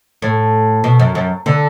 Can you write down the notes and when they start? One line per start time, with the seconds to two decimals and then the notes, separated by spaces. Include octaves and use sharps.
0.22 A2
0.84 B2
1.00 F#2
1.15 F#2
1.46 D3